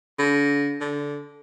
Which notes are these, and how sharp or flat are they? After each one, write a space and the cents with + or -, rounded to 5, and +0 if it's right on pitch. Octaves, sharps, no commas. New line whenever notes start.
D3 -45
D3 -15